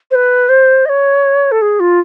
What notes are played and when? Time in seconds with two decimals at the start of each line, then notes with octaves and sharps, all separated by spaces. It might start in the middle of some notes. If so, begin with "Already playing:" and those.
0.11 C5
0.15 B4
0.49 C5
0.85 D#5
0.89 C#5
1.52 A4
1.62 G#4
1.80 F4